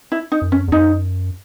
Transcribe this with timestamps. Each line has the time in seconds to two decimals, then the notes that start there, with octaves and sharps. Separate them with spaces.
0.12 E4
0.32 D#4
0.42 F#2
0.52 C#4
0.68 E2
0.72 F#2 D#4